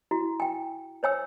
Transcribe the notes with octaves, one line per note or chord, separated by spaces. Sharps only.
E4 F#4
G5 G#5
C5 C#5 G#5 E6